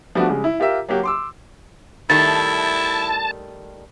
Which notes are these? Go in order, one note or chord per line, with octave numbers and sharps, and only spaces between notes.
F3 G3 A3 B3 D4 F#4
C#3 G3 G#3
E4
F4 G4 A#4 E5
F#3 A#3 F#4 G4
C6 D6 E6
D#3 G3 A3 E4 A5 A6